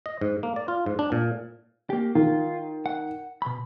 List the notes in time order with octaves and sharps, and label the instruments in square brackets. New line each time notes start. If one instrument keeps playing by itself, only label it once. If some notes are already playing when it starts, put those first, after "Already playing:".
[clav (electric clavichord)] D#5
G#2
A#3
D5
F4
G#2
D4
A#2
[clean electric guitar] A#3 G4
[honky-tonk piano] D#3 [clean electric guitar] F4
[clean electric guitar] F#5
B2 B5